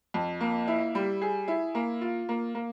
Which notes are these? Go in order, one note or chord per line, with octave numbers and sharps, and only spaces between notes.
F2
A#3
E4
G3
G#4
E4
A#3
F4
A#3
A#3